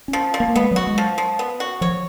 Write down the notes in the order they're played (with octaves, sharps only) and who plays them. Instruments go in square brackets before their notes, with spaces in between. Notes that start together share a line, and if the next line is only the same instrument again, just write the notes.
[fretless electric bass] C#4
[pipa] F3
F3
[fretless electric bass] A#3
[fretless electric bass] G#3 [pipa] B3
[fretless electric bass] F#3 [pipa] F#4
[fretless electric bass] G#3
[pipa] F3
F3
B3
F#4
[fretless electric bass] F3 [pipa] C#5